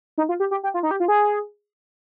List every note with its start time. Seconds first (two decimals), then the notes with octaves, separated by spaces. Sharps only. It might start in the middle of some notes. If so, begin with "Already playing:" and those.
0.18 D#4
0.29 F4
0.40 G4
0.51 G4
0.63 G4
0.74 F4
0.83 D#4
0.91 G4
1.00 F4
1.08 G#4